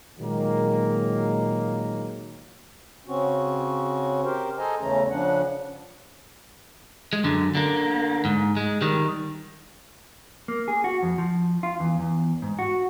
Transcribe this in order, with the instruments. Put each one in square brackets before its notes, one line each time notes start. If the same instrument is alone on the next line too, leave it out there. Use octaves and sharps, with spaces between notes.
[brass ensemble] A#2 D#3 F#3 G#3 A#3
[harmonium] C#3 C4 C#4 F#4
G4 A#4 C5
G#4 A4 C5 D#5 G#5 A#5
E2 C#3 E3 A3 C#4 A#5
C#3 F3 C#4 D4 F#5
[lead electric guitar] G#3
F#2 D3
D3 A#3
G#2
G#3
D#3 G3
[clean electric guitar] A#3
G#4
F#4
F2
F3
F4
E2
E2
G#2
F#4